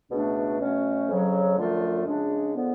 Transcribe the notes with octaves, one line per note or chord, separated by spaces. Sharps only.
C#2 B2 A3 D4
B2 F#3 A3 C#4
F2 C#3 F#3
F#2 D3 F3 A3 F4
C#3 G#3 D4
D3 F3 B3